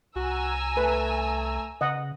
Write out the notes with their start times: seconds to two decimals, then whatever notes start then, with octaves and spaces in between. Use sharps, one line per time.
0.16 C2 F#4 G#5 A#5 E6
0.77 A3 B4
1.81 C#3 D#5 F#5